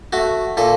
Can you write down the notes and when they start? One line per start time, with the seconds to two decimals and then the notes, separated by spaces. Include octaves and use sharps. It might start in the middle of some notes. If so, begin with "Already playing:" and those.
0.13 A3 F#4
0.57 A#2 A4